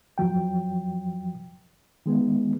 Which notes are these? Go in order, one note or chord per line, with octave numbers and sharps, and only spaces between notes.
F2 F3 F#3 G5
D#3 G#3 B3